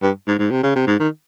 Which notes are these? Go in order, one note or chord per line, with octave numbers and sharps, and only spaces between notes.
G2
G#2
G#2
C3
C#3
C3
G#2
D#3